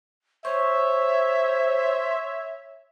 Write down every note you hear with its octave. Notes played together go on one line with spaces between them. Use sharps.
C5 C#5 E5 C#6